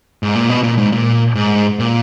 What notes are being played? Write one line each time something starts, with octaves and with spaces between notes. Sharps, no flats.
G#2
A#2
B2
A#2
G#2
A#2
G#2
A#2